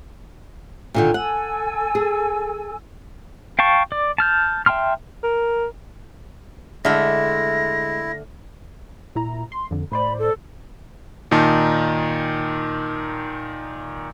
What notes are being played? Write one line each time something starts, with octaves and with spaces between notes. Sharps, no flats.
A#2 D3 D#3
A4 F#5 G#5 E6
G#4
F5 G5 A5 C#6
D5
A5 F6 G6
E5 G5 A5 C6 F6
A#4
D3 G#3 A3 E4 E5 F6 A#6
A#2 E4 A#5
C6
F2 D3
A2 C5 D5 B5
A4
A#2 D#3 D#4 A5